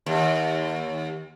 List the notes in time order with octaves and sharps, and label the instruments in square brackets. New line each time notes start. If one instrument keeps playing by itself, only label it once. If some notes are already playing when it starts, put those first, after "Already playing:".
[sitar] D#2